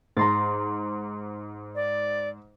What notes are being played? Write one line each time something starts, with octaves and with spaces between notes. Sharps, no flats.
G#2 A#5 C6 A6
D5